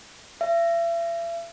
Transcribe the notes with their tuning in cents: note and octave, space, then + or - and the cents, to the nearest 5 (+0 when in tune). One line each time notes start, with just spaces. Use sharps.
E5 +40